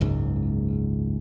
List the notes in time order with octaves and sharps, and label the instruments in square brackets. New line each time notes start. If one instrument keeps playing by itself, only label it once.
[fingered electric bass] F#1 C#2 G#2